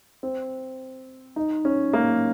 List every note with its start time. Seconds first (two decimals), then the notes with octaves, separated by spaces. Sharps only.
0.23 C4
1.36 D#4
1.65 C#4
1.93 A#3